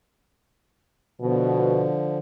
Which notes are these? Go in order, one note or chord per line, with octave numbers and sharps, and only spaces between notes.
B2 D3 F3